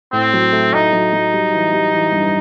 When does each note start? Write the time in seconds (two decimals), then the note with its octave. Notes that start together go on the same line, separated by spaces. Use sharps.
0.13 A2 C4
0.33 F#3
0.53 A3
0.74 A2 D#4
0.92 F#3
1.13 F#3
1.33 G3
1.52 E3
1.73 G3
1.92 E3
2.12 G2